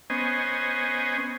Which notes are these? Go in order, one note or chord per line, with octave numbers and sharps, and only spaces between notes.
B3 C#4 C5 D#5 G#5